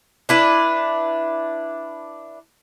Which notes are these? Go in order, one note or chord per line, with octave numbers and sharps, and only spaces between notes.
D4 E4 B4